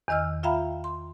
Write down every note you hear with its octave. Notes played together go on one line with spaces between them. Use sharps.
E2 D#3 D#5 E6 F6
F4 E5 F5 G5 A#5 B5
C6